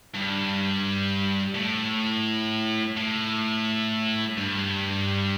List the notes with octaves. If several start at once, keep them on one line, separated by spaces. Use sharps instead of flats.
G2
A2
A2
G2